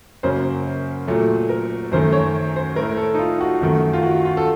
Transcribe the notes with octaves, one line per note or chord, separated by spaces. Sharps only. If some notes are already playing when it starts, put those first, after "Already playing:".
F#2 C#3 F#3 A#3 C5
A#2 F#3 A3
A#4
F#2 D#3 A3 C5
C#5
C5
A2 A3 A#4
A4
D#4
F4
F#4
F#2 D#3 A3
F4
F#4
F4
A4